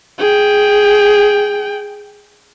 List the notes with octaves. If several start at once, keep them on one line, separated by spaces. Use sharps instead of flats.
G#4 G5